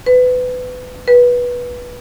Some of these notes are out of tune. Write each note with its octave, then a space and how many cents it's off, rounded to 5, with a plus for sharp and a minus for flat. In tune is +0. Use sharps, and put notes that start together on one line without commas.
B4 +25
B4 -15